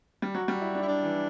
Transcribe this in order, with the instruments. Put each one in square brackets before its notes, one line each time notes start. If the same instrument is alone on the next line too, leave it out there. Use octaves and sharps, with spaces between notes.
[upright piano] G3
[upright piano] F#3 [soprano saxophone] F#4
[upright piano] G3
E4
D4
[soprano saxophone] E4
D4
[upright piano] E3